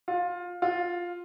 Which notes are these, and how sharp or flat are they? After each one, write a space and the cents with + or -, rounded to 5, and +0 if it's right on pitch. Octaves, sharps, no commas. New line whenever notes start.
F4 +15
F4 +5